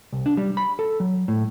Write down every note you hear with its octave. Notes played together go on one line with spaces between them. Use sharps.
C2
D4
G3
B5
A4
F#3
A2